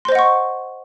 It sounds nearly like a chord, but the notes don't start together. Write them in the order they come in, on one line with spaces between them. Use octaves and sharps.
C6 C5 D#5 F#5 C#6